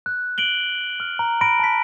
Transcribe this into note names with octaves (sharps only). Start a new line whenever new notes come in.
F#6
D7 F#7 G7
F6
A#5
B5 A#6 D7
A5 B6